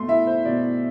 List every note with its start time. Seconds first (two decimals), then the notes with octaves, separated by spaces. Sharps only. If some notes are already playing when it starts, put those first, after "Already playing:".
Already playing: B2 A3 C6
0.08 E4 E5
0.27 C5
0.45 B2 D5